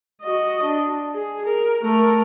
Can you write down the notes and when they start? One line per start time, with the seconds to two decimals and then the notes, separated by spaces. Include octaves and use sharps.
0.22 F#4 D#5
0.64 D4
1.15 G#4
1.47 A#4
1.83 A3 A#4